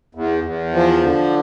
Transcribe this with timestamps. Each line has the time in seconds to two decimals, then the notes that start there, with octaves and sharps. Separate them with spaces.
0.15 E2
0.44 E2
0.74 F3
1.03 D3